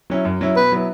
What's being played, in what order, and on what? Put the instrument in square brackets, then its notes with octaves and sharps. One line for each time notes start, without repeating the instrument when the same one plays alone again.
[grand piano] F#3 C#4 E4
F#2
F#3 C#4 E4
[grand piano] B2 [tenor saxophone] B4
[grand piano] F#3 B3 E4